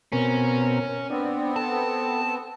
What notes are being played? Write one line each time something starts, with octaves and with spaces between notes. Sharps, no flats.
B2 C4 C#4 A#4
B3 C4 D4
A4 A5